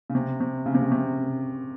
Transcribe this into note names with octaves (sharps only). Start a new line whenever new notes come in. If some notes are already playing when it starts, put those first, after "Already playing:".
C#3
C3
C3
C#3
C3
C#3
C3